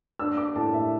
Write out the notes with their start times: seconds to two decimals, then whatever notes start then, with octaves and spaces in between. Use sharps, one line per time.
0.19 D4 E6
0.37 D6
0.56 A2 A5
0.74 E5